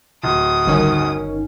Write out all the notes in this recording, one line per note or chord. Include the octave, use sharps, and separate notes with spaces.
D1 D#6
G1 D#3 C#4